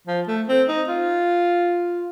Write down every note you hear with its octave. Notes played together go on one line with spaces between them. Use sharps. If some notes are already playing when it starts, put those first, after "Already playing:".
F3
A3
C4
D#4
F4